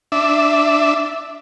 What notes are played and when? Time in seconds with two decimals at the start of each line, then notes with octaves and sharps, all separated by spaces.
0.12 D4 E5